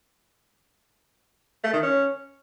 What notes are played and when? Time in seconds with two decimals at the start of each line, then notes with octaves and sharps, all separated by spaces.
1.64 A3
1.73 D#3
1.83 C#4